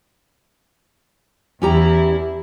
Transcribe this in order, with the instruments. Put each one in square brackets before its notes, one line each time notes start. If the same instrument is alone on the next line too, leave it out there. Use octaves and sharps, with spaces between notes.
[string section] E2 E4 [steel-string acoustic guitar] C#4 G4 A#5